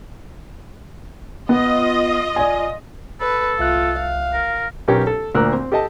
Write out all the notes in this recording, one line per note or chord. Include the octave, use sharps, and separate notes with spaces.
B3 F4 D#5
D5 G#5
A4 B4
C2 F4 E5 F#6
F5
A#4
B1 C#4 G4 A#4 C#5
A4
D2 A#2 A#4 E6 F#6
C4
G4 A4 D#5 A5